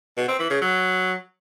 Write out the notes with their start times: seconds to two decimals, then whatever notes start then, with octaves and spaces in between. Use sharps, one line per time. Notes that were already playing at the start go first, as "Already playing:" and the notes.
0.17 B2
0.28 C4
0.39 E3
0.50 C#3
0.61 F#3